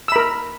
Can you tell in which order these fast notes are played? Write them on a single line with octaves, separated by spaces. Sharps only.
E6 B5 A#4